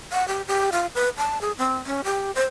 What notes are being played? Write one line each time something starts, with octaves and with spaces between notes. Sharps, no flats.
F#5
G4
G4
F4
B4
A5
G#4
C4
C#4
G4
C5